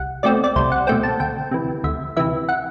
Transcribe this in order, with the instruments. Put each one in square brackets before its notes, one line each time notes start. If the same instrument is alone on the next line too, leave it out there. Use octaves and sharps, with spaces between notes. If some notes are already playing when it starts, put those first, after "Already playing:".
Already playing: [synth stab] C2 F#5
B2 A3 C4 D5
D5
C2 C5
F#5
B2 A3 C4 G5
A5
D2 G5
C3 E3
D2 E5
C3 E3 E5
F#5